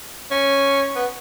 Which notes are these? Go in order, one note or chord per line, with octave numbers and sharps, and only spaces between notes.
C#4
B3